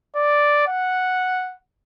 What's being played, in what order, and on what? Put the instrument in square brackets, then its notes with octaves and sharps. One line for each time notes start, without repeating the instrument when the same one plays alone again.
[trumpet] D5
F#5